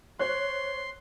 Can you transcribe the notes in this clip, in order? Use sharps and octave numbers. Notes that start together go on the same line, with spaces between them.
C5 C#5 C6 F#6